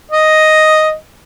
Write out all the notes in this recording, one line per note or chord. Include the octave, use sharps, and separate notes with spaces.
D#5